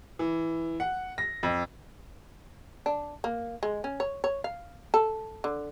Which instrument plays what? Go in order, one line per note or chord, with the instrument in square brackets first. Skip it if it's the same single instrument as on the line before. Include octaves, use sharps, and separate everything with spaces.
[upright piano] E3
F#5
A#6
F2
[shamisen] D4
A#3
G#3
C#4
C#5
C#5
F5
A4
D3